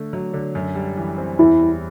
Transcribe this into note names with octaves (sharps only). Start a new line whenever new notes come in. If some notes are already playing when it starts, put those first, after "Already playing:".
Already playing: D3 A3
F#3
D3
F#2
G3
E3
C4
E2 E4
G3